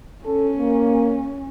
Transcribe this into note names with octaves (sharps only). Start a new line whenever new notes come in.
C#4 A4
A#3